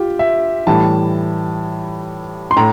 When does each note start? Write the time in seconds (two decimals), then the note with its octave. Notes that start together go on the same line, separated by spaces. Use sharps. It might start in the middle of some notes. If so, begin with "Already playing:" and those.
Already playing: F4 G4
0.19 E5
0.67 A2 E3 G3 A5
2.51 C6
2.56 A2 A#5